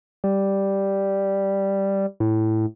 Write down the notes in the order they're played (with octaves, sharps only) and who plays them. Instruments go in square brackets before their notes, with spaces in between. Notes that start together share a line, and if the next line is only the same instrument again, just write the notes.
[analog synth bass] G3
A2